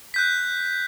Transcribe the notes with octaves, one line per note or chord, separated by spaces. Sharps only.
F#6 G6 B6